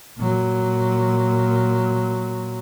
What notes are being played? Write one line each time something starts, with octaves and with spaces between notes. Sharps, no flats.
A#2 F#3